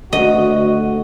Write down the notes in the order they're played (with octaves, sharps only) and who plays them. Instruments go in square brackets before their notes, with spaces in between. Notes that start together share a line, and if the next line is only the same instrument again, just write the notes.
[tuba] D2 [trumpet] F#4 [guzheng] D#5